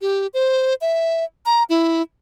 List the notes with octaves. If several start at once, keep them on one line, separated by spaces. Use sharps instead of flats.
G4
C5
E5
A#5
E4